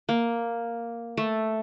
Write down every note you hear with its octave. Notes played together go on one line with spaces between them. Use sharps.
A#3
A3